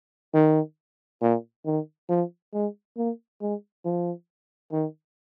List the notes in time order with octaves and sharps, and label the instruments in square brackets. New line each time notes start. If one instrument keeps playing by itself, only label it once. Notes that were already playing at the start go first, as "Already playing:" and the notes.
[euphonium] D#3
A#2
D#3
F3
G#3
A#3
G#3
F3
D#3